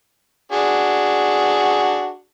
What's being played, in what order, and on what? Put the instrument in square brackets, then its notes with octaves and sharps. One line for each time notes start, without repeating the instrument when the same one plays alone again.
[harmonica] D4 F#4 G#4